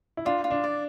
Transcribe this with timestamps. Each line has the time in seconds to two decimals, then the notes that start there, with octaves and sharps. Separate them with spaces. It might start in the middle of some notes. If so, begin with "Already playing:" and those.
0.17 E4
0.25 D4 F4
0.44 F4
0.51 D4
0.64 D5